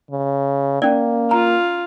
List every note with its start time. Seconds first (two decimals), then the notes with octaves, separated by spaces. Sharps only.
0.11 C#3
0.82 A#3 C#4 D5
1.31 F4 A#5